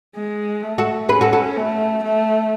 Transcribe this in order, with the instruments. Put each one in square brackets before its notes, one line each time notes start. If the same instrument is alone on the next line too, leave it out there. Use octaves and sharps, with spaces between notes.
[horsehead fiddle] G#3
A3
[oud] F#4 A4
[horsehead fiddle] C#4 [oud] G#4 B4
[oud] F#4 A4
F#4 A4
[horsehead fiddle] A3
A3